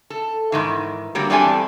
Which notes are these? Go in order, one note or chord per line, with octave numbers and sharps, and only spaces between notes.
A4
G#2 D#3 E3
D3 F#3 G3 A#3
E2 G3 C4 D4 A4 G#5